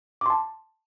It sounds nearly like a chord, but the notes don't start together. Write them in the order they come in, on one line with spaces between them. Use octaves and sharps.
D6 C6 A5